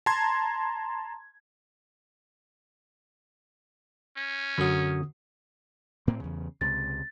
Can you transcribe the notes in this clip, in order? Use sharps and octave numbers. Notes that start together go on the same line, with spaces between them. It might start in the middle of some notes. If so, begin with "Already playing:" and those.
A5 A#5 C6 G#6
C#4
F#2 D3 F#3 D#6
A2 A#3 C4
E2 C#3
C#2 C3 A6